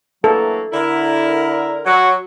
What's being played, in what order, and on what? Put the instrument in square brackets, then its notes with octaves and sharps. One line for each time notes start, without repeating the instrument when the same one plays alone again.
[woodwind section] E3 F#3 A#3 [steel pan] A4
[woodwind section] D3 A#4 [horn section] E4
[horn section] F#3 [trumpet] F#4